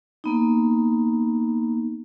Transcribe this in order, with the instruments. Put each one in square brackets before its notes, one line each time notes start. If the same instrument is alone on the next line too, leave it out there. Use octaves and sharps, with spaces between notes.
[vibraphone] A#3 B3 D#4